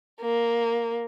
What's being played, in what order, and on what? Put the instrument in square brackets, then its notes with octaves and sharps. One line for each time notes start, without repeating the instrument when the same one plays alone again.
[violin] A#3